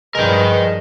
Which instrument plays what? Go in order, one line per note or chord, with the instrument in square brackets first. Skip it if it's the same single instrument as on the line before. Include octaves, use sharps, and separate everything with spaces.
[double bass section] G2 F3 [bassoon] G#3 [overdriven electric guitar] A#4 G5 [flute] B4